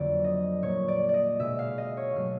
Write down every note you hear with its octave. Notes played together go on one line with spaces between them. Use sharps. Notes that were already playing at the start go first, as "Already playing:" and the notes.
Already playing: F2 D3 F#3 A#3 D5
D#5
A#2 G3 A#3 C#5
D5
D5
D#5
B2 G#3 E5
F5
D#5
C#5
B2 F#3 A3 F5